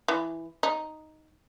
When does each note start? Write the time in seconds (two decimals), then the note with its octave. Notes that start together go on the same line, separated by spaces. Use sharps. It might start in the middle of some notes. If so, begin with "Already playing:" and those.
0.08 E3
0.63 D#4